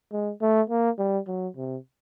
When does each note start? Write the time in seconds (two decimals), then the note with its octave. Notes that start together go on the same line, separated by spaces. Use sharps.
0.12 G#3
0.42 A3
0.70 A#3
0.98 G3
1.27 F#3
1.56 C3